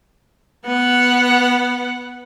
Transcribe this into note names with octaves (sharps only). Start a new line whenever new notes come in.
B3 F#5